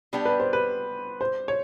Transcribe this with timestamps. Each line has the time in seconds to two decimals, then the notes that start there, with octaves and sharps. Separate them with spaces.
0.13 G3 B3 D4 G4
0.25 B4
0.40 C5
0.53 B4
1.21 C5
1.48 C#5